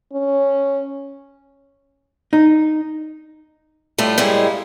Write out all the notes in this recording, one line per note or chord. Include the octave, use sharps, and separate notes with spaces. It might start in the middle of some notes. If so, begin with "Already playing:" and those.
C#4
D#4
A2 G3 A3 F4
A2 G3 G#3 A#3